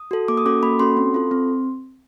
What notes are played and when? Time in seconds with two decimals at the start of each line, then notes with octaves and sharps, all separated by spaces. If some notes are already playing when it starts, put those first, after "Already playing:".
Already playing: D#6
0.11 F#4 A4
0.28 A#3 D6
0.37 D#6
0.45 C#4 F#4 A4 D6
0.63 A#3 B5
0.80 C#4 F#4 A4 C6
0.97 C4
1.14 F4 A4
1.31 C4